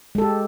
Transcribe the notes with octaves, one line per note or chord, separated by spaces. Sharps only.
G#3 G4 A4